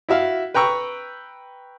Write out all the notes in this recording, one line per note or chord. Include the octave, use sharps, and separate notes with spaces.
E4 F#4 E5 F5
B4 G5 A#5 C#6 E6